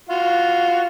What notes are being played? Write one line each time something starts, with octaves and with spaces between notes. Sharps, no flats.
F4 F#4